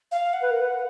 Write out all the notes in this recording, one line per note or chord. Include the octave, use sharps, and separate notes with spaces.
F5
F#5
B4
A#4
B4